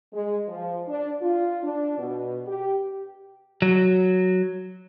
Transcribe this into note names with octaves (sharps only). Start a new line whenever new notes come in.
G#3
F3
D4
F4
D4
B2
G4
F#3